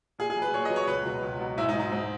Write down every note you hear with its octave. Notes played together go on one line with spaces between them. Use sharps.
A#2 G#4
G#4
F#3
B4
A#2 C#5
D#5
F#3
C#5
C#2 B4
B2 F#3
C#2
B2 F#3
G#2 E4
D#4
F#3
D#4
G#2